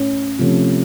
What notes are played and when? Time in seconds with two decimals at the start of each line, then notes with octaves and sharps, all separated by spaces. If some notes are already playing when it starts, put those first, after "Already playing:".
Already playing: A2 C#4
0.39 C3 F3 A3 C#4